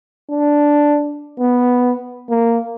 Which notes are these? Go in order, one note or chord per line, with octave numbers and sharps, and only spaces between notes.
D4
B3
A#3